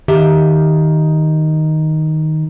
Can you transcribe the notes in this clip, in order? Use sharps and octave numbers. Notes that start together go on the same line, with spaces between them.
D#3 G4 E5